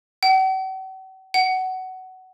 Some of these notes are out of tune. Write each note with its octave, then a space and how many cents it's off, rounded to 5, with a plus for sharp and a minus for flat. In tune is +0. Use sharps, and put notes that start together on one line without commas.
F#5 +45
F#5 +20